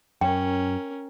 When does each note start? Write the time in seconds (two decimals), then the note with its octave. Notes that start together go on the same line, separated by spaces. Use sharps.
0.21 F#2 C#4 A#4 G5